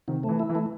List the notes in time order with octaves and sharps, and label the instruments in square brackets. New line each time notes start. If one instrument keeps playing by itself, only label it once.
[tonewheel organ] C3 [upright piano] D#3
[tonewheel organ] A3
[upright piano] E3
[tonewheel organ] E4
[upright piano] E3
[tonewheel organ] A3